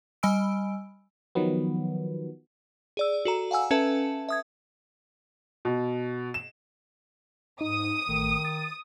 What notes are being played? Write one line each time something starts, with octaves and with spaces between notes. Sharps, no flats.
G3 D#5 G#5 B5 E6 D7
D#3 F3 F#3 B3
G#4 D5 E6
F#4 A4 A#5
F5 F#5 G#5 E6
C#4 A4 B4 E5 A5
E5 D#6 G#6
B2
E7
G#2 D#4 D#6
A1 D#3 A3
A6